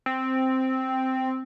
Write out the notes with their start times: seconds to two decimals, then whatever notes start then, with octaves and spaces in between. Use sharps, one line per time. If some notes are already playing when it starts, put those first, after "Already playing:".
0.06 C4